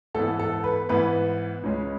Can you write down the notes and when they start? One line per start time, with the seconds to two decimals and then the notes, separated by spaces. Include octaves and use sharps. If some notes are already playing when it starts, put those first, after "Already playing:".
0.14 G#2 E3 B3 A4
0.39 A4
0.64 B4
0.89 G#2 E3 B3 B4
1.63 C#2 C#3 G#3 C#4